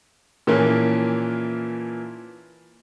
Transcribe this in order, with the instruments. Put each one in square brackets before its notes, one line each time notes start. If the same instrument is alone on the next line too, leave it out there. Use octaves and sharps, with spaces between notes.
[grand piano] A#2 E3 F3 A#3 C#4